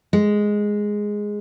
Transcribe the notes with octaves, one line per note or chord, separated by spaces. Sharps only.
G#3